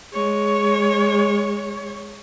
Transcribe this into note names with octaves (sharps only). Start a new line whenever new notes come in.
G#3 C#5